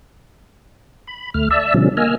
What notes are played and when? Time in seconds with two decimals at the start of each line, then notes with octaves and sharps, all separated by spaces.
1.07 B5
1.34 D2 A3 F6
1.51 D5 E5 A5 E6
1.74 B2 D3 F3 G3 C#4
1.97 A#3 D#5 G#5 E6 F6